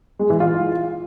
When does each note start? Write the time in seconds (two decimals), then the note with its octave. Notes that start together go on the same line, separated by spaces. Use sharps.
0.19 G#3
0.30 E3
0.40 F4